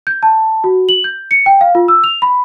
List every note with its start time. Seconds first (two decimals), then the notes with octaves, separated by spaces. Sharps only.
0.07 G6
0.23 A5
0.64 F#4
0.89 F#7
1.04 G6
1.31 C#7
1.46 G5
1.61 F5
1.75 F4
1.88 E6
2.04 F7
2.22 B5